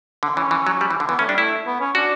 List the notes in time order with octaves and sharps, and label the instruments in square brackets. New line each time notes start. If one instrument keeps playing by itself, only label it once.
[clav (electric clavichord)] D3
[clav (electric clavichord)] E3 [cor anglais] C#4
[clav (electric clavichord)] E3
F#3
G3
E3
D3
[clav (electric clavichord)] E3 [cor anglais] B3
[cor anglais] A3 [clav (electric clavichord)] C#4
[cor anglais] G3 [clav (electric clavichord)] D4
[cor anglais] A3 [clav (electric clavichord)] E4
[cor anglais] B3
C#4
[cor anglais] D4 [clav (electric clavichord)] F#4